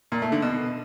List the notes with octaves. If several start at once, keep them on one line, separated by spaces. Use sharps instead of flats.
A#2
A3
D3
B2